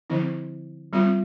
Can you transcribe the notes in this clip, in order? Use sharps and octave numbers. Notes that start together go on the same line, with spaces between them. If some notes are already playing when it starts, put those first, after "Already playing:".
D3 F3 C4 E4
G3 C4 F4